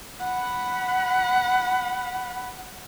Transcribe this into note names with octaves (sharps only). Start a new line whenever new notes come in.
F#5 B5